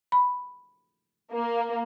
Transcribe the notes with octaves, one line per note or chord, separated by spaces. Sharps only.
B5
A#3